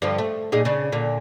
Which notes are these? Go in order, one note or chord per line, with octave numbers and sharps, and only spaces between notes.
G2 D3 F3
A3
A#2 D#4 G#4
C#3 D4
A#2 D3